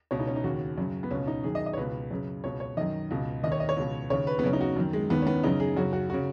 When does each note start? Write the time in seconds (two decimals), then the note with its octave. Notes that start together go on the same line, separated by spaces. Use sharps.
0.11 C#2 B2 C#5
0.19 D#4
0.27 C#4
0.36 D#4
0.44 D#2 C#3 F#4
0.78 F#2 C#3
1.03 B3
1.11 C#2 B2 C#4
1.27 D#4
1.44 F#2 D#3 G#4
1.55 D#5
1.66 D#5
1.73 C#5
1.77 C#2 B2 B4
2.11 F#2 C#3
2.44 C#2 B2 C#5
2.60 C#5
2.77 F#2 D#3 D#5
3.11 C#2 B2
3.44 D#2 D#3 D#5
3.52 C#5
3.60 D#5
3.69 C#5
3.77 C#2 B2
4.10 D#2 C#3 C#5
4.27 B4
4.39 B3
4.43 F#2 C#3 C#4
4.53 D#4
4.61 F#4
4.77 F#2 D#3
4.93 G#3
5.10 D#2 D#3 B3
5.22 C#4
5.27 B3
5.43 F#2 C#3 D#4
5.60 G#4
5.77 F#2 C#3 F#4
5.93 F#4
6.10 C#3 F#4